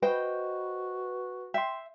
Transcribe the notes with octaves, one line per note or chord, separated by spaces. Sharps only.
F#4 B4 C5 D#5 G5
E5 G5 C6